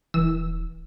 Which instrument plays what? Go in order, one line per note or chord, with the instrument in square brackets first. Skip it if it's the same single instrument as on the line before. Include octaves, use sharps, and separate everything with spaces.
[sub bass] D#1 [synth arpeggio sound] E3 E6